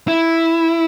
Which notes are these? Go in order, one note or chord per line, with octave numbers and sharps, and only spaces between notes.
E4